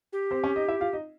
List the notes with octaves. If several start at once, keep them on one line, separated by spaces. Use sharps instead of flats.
G4
C4 C5
C#4 C#5
D#4 D#5
E4 E5
F4 F5
D#4 D#5